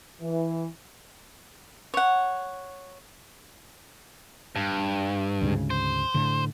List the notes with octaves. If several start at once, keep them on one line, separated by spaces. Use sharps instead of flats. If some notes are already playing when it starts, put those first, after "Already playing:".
E3
C#5 F#5
G2
D2 G#2 C#3
C5
A2 D3